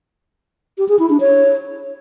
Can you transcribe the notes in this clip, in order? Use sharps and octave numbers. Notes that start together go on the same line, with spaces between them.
G4
G#4
E4
D4
C#5